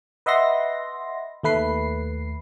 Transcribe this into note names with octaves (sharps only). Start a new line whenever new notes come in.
B4 D#5 E5 F#5 C6 A#6
D#2 A3 B4 C7